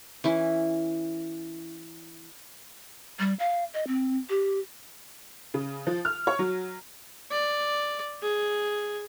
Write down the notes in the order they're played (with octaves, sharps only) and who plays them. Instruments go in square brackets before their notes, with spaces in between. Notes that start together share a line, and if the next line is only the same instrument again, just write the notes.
[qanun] E3 C#4 E4
[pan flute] G3
F5
D#5
C4
G4
[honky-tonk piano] C#3
F3
F6
C#5
F#3
[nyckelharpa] D5
G#4